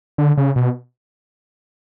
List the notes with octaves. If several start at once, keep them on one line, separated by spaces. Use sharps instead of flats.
D3
C#3
B2